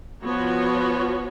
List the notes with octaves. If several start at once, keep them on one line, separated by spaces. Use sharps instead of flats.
F3 B3 F#4 C#5